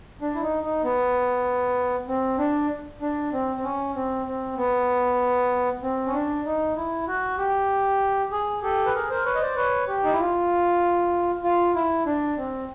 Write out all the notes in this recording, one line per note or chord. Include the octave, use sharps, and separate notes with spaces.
D4
E4
D#4
D#4
B3
C4
D4
D4
C4
C4
C#4
C4
C4
B3
C4
C#4
D4
D#4
E4
F#4
G4
G#4
G4 A4
B4
G#4 A#4
A#4 C5
B4 C#5
D#5
C5 D5
B4 C#5
G4
D#4
E4
F4
F4
E4
D4
C4